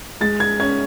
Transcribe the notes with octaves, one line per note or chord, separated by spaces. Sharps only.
G#3 A6
G#6
C#4 G#6